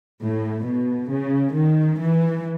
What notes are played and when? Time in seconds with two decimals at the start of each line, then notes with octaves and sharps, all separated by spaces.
0.22 A2
0.66 B2
1.10 C#3
1.55 D#3
1.99 E3